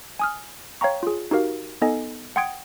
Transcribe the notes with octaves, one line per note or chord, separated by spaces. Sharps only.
G#5 D#6 F6
C#5 F5 G5 A#5 C#6
F4 G#4
D#4 F#4 G4 A#4 F5
B3 D#4 A4 D#5 G#5
F#5 G5 C6 D#6 G#6 D7